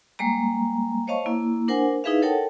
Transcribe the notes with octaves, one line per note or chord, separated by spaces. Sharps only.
G3 G#3 A#3 A#5
C5 C#5 D#5 F5 A5 C#6
A#3 E4
D4 A#4 C5 F#5 G#5
D#4 E4 G#4 B4 E5 F5
A4 A#4 C#5 F#5 G5 A5